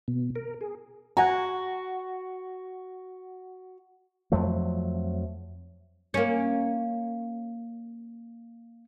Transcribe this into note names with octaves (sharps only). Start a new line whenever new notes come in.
B2
A#4
G#4
F#4 F#5 G#5 A#5
F2 F3 F#3 A3
A#3 C#4